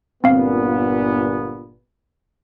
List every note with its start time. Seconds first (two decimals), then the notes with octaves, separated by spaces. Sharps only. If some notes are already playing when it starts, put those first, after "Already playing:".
0.24 G1 A#2 B3 C4 F5